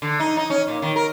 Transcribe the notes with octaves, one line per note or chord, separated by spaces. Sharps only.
D3
D#4
D#4
C#4
A#2
D#3
A#4